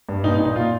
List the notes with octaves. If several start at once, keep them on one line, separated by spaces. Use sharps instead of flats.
G2
A#2 D#4
A#2
D#4
A#2 F4